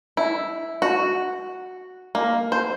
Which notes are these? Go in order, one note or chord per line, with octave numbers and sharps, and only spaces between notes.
E4
F#4
A#3
C5